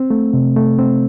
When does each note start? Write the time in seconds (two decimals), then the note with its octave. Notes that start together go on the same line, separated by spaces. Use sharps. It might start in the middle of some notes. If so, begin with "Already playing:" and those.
Already playing: C4
0.10 A3
0.33 C3
0.56 A3
0.79 C4